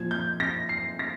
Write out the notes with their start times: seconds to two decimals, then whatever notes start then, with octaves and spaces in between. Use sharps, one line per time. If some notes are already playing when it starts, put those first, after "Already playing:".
Already playing: A#2 F3 G#6
0.11 G6
0.40 A#6
0.69 C7
0.99 A#6